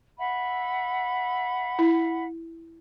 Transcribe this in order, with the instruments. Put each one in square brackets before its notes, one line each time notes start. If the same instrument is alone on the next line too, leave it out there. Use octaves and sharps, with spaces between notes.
[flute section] E5 F#5 B5
[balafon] E4